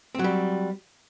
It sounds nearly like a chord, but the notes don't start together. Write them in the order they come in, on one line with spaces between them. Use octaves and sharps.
C4 F#3 G3